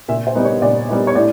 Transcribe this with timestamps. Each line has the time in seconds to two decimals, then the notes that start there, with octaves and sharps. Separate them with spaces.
0.08 A#2 E5
0.27 C5
0.35 G3 B3 D#4
0.45 C#5
0.62 A#2 D5
0.89 G3 B3 D#4
1.07 C#5
1.15 A2 D5